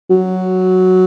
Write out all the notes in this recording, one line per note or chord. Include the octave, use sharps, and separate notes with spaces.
F#3